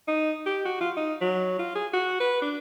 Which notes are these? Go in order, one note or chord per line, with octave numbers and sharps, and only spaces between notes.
D#4
G4
F#4
F4
D#4
F#3
F4
G#4
F#4
B4
D4